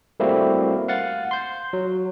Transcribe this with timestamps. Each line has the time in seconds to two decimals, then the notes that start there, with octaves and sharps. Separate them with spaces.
0.20 G3 A3 A#3 C4 E4 F#4
0.88 F5 F#5 A6
1.31 C6 G6
1.73 F#3